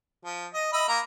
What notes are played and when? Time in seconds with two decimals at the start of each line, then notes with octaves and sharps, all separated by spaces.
0.24 F3
0.54 D#5
0.73 D#5 E5 B5
0.88 A#3 A#5